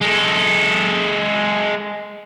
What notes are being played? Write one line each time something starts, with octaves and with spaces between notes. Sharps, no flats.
G#3 A4